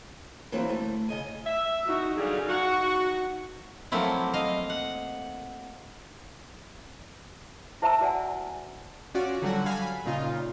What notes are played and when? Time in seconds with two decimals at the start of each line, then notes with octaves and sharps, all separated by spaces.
0.52 E3 F#3 A#3 C4 D4
0.69 D2 A3
1.09 C#3 D#5 G#5
1.46 E5
1.87 D#4 F#4
2.18 D3 F#3 G3 G#4 F5
2.49 D#4 F#4
3.92 F3 F#3 A3 A#3 C4 E4
4.34 D#5 F5
4.70 F#5
7.82 E4 C5 E5 A5 A#5 E6
8.01 F#4 D5 F#5 G#5
9.15 C#4 F4 F#4 D5
9.42 D3 F#3 G3 F#4 F#5
9.66 F5 G#5 A5 B5
9.82 B5
10.06 A#2 C#3 D#4 F4